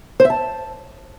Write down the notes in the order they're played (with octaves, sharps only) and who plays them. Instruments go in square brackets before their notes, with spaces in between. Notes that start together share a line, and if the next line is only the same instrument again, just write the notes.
[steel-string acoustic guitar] C5
E5
A5